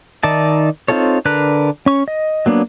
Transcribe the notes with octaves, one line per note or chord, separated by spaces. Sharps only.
D#3 D#4 D5 E5 A5
C4 D#4 F4 A4 C#5
D3 D4 A#4 B4 F#6
C#4 C#6
D#5
F#3 A#3 B3 D4